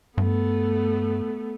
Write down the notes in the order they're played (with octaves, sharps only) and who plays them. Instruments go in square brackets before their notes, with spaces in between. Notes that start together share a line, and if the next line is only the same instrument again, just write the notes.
[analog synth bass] G2 [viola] A3 B3